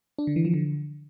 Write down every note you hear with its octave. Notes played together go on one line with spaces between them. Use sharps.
D4
D3
E3
F3
D3